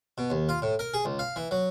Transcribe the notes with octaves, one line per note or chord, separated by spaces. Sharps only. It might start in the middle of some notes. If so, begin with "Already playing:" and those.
B2
D#2
F4
A2
A#4
G#4
C#2
F5
E3
F#3